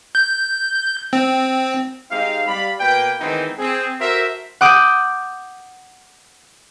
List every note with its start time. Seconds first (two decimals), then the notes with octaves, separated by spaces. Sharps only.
0.15 G6
1.13 C4
2.10 G#3 C4 D#4 G4 F5
2.47 G3 D5 F5 B5
2.79 B2 A#3 B4 G5
3.20 D#3 E3 G#3 B3 C4 D#4
3.59 C4 G#4
4.00 F#4 A4 A#4 C5 E5
4.61 F#5 D6 D#6 G6